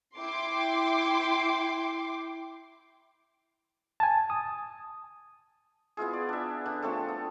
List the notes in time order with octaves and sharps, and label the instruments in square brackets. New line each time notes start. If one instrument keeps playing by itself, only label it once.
[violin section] E4 G5 C6 D6
[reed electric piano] G#5 A5
D#6
[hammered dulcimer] B3 E4 F4 G#4
D5
D4 E5
D3
F3 A3 C4 A4
B3